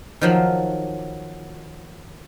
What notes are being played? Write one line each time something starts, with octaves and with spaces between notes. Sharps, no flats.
D#3 F3 F#3